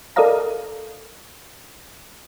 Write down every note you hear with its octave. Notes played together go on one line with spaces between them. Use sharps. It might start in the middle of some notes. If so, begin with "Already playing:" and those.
A4 A#4 D5 D#5 F5 A#5